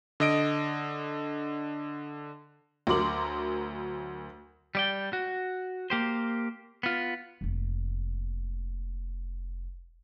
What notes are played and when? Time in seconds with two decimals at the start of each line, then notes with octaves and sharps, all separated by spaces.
0.20 D3 D#5 D7
2.87 D2 F#3 A#4 C6 D6 F#7
4.75 G3 D5 G5
5.13 F#4
5.90 A#3 G4 C5
6.83 B3 F4
7.41 F1 A#3